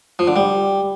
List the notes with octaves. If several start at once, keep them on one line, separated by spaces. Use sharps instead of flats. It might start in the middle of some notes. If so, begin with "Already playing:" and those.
F3
D3
G3